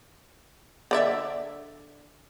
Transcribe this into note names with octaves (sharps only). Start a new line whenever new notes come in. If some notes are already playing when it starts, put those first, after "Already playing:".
D3 D5 E5